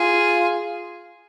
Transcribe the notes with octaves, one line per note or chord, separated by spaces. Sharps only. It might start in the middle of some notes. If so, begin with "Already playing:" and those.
Already playing: F4 G#4